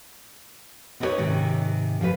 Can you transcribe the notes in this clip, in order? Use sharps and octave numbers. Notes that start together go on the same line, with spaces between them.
B3 C4 D#4 E4 B4 C#5
G#2 C3 D#3
F3 F4 F#4 B4